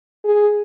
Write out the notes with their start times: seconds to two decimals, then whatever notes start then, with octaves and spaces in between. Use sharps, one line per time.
0.25 G#4